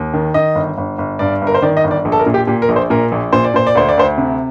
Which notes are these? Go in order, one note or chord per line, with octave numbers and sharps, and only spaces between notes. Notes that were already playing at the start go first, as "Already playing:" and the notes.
Already playing: D#2
D#3
D#3 D#5
G1
G1
G1
G2 D5
G1
A#4
C5
D#3 D5
D#5
G1
D5
A#1
A4
A#4
A#2
G4
A#2 G4
A#4
A#1
C5
A#2 A#4
A#1
A#2 C5
D5
A#2 C5
D5
D2 C5
D5
D2 C5
C3